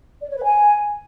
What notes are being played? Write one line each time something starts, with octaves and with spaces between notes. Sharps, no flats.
D5
C#5
B4
G#5